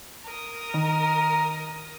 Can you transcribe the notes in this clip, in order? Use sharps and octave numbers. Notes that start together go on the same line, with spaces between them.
A#4 D#6
D#3 A#5